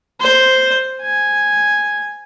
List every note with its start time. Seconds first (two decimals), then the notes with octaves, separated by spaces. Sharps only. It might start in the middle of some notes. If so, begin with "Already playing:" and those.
0.21 C5
1.02 G#5